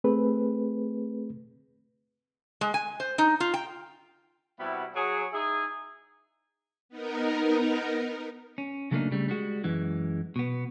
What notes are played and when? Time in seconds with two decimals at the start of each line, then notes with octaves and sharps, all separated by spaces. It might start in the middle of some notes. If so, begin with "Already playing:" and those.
0.04 A3 C4 G#4 B4
2.61 G#3
2.74 G#5
3.00 C5
3.18 D#4
3.40 F4
3.54 G5
4.60 C3 G3 B3 E4 F#4
4.95 F#3 G#4
5.33 D#4 E4 G#4
6.89 B3 D#4 A#4
8.58 C#4
8.91 C#3 F#3 A3 A#3 D4 D#4
9.11 C#3 G3 A3
9.28 G3 G#3 F#4
9.64 F#2 E3 G#3
10.36 B2 B3